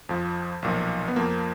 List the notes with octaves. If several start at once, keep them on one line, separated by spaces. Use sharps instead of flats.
F2 F3
B1 A#2 F3
B3
F2 F3 A#3